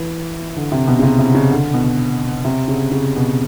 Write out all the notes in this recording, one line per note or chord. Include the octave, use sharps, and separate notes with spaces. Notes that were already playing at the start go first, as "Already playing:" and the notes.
Already playing: E3
D3
C3
B2
C#3
C3
C3
C#3
D3
B2
C3
C#3
C#3
B2